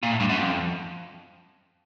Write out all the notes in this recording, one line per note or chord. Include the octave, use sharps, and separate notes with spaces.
A#2
A2
G2
F#2
F2